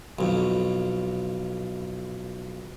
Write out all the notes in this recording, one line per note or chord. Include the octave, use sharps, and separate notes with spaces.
B1 F2